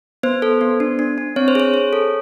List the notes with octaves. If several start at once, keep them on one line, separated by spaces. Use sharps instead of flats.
B3 C5
A4
B3
D4
D4
D4
C4 C#5
C5
G#4 C#5
G#4
A4